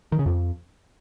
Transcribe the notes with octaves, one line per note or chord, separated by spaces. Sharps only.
D#3
C#3
F2